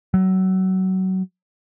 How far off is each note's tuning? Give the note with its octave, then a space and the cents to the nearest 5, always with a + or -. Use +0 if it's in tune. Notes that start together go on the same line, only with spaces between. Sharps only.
F#3 +25